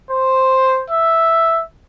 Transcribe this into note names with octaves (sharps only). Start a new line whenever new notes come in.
C5
E5